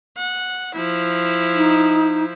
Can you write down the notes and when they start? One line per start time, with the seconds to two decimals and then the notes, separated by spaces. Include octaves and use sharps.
0.18 F#5
0.75 F3 E4
1.55 D#4